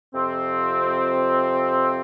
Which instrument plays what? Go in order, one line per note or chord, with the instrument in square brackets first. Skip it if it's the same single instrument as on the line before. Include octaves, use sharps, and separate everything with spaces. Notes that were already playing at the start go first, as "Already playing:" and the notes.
[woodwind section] F2 C3 F3 C4